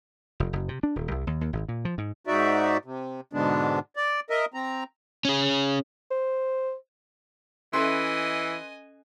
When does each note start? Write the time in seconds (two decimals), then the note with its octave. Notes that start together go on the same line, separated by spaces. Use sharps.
0.40 F1
0.53 F#1
0.69 C3
0.83 D4
0.96 D#1
1.11 C2
1.27 D#2
1.41 D#2
1.53 G#1
1.68 A#2
1.85 F3
1.98 G#2
2.27 G#2 D#4 F#4 D5 E5
2.85 C3
3.33 G#2 B2 D3 G#3 B3 D4
3.96 D5
4.30 A#4 D#5 E5
4.54 C4 A#5
5.25 C#4 G#4
6.10 C5
7.73 E3 C#4 A4 B4 D#5 E5 G#5 C6